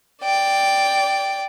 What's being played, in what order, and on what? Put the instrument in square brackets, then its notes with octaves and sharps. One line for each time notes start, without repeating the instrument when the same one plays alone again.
[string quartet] D5 G5